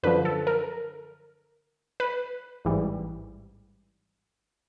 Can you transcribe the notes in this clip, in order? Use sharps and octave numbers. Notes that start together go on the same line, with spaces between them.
F#2 D3 F3 B4
A4
A#4
B4
A1 G#2 E3 G3